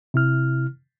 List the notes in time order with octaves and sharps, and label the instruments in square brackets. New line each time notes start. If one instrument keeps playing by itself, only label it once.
[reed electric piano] C3 E4 F6